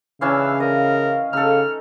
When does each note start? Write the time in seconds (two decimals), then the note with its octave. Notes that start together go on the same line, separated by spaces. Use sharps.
0.21 C#3 E3 C#4 D4 F5 E6
0.60 A#4 D#5 F5
1.33 C#3 D#4 A4 F6